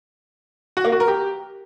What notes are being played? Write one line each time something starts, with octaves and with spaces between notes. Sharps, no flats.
F#4
A#3
F#4
A#4
G4